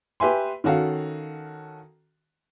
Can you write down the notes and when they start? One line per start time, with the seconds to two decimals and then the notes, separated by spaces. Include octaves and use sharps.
0.20 G4 B4 E5 G#5 C6
0.64 D#3 C#4 F#4 A4 F5